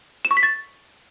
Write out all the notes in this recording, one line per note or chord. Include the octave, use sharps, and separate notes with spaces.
E7
C#6
B6
A6